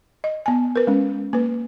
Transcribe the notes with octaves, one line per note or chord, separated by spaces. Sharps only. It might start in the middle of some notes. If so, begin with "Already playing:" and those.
D#5
B3 G#5
A#4 B4
G#3 C#4
A#3 B4